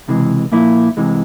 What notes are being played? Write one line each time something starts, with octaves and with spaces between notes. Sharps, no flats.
C#2 C3 E3 G#3
A#2 F3 A#3 E4
C2 C3 E3 G#3